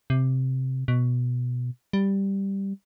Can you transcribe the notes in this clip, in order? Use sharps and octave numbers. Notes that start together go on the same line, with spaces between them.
C3
B2
G3